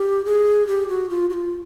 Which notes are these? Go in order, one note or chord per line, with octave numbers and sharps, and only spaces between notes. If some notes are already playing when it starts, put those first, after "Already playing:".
Already playing: G4
G#4
G4
F#4
F4
F#4
F4